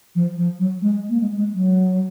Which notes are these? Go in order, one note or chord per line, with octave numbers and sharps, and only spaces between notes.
F3
F3
F#3
G#3
A#3
G#3
G#3
F#3